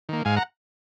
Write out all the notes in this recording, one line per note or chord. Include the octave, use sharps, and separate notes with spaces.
D#3 A#3
G#2 F5 G#5
F#5 A#5